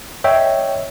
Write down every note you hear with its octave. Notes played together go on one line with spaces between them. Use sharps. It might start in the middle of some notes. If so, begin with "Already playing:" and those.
C#5 D#5 E5 G5